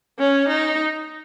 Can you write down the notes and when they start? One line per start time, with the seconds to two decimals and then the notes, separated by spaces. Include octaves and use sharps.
0.19 C#4
0.48 D#4